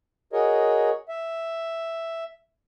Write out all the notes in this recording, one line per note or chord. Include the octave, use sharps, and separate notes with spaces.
F#4 G#4 A#4 C#5 D#5
E5